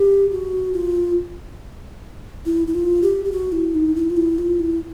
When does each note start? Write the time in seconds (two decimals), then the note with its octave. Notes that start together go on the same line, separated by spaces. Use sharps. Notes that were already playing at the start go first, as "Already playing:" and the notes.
Already playing: G4
0.31 F#4
0.74 F4
2.46 E4
2.67 E4
2.75 F4
3.03 G4
3.25 G4
3.32 F#4
3.52 E4
3.75 D#4
3.96 E4
4.10 F4
4.17 E4
4.38 F4
4.59 E4